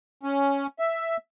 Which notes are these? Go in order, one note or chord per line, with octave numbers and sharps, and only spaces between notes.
C#4
E5